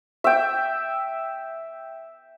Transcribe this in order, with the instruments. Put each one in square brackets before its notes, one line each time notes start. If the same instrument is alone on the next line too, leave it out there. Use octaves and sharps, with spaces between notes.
[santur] E5 G5